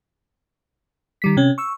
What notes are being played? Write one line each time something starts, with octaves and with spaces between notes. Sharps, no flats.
D#3 G3 B6
C3 C#4
C#6 E6